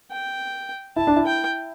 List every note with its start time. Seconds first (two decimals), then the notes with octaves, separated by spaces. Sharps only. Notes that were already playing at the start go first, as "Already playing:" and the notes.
0.11 G5
0.96 E4 A5
1.07 D4
1.16 E4
1.26 G5